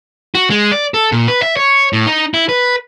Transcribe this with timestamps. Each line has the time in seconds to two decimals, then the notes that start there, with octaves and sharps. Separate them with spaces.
0.35 F#4
0.50 G#3
0.72 D5
0.94 A4
1.12 A#2
1.28 B4
1.42 E5
1.57 C#5
1.93 A2
2.07 D#4
2.34 E4
2.49 B4